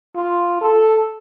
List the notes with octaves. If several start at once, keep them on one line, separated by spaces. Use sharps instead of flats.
F4
A4